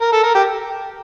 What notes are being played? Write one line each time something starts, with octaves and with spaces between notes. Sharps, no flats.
A#4
A4
A#4
G4